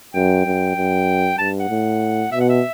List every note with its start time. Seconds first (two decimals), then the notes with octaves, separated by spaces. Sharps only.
0.14 F#2 G5
0.46 F#2
0.76 F#2
1.38 G2 A5
1.60 F#5
1.69 A2
2.32 B2 E5
2.41 F#5
2.49 E5